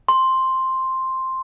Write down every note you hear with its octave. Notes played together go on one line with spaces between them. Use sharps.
C6